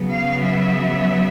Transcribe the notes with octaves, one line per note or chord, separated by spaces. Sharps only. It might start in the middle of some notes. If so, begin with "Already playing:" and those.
Already playing: C#3 F#3 B3
F5
E5